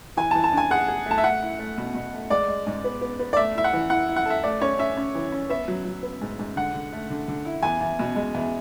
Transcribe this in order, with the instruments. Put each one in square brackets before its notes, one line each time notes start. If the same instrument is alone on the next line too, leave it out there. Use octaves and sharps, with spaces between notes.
[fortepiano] E3 [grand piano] G#5
[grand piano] A5
[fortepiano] E3
[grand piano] A5
[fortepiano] D4 [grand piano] G#5
[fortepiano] G#4 [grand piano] F#5
[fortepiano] G#4
[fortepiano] A3 [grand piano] A5
[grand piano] E5
[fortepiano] A3 [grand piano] F#5
[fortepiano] E4
A3
B2
B2
A3
[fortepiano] G#3 [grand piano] D5
[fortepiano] G#3
G#2
B3
B3
B3
[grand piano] D5
[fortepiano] A3 [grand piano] E5
[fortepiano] E4 [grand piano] E5
[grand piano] F#5
[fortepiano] E3
[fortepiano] E4 [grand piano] F#5
[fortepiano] E4
[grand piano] F#5
[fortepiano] A4 [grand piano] E5
[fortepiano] A3 [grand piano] D5
[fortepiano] C#4 [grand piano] C#5
[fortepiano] C#4 [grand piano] E5
[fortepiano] C#4
E3
C#4
[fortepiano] B3 [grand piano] E5
[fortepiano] F#3
F#3
B3
G#2
G#2
[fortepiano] D3 [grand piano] F#5
[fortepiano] D3
A3
D3
D3
E4
[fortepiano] E2 [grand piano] G#5
[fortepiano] E2
B2
G#3
E2